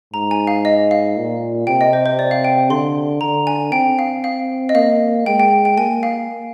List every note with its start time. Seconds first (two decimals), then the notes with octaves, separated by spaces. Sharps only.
0.13 G#2 A#5
0.31 G#5
0.47 F5
0.65 D#5
0.91 F5
1.17 A#2
1.67 C3 G5
1.81 D#5
1.93 C5
2.06 C5
2.19 D5
2.31 F5
2.45 G5
2.70 D3 C6
3.21 D3 A#5
3.47 G#5
3.72 C4 G5
3.99 F5
4.24 F5
4.69 D#5
4.75 A#3 F5
5.26 G#3 G5
5.40 G5
5.65 G5
5.77 A#3 G#5
6.03 F5